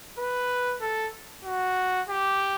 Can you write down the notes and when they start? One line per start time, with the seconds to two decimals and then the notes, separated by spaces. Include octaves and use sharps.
0.19 B4
0.81 A4
1.45 F#4
2.09 G4